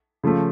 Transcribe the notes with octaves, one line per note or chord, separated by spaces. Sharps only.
C#3 F3 A3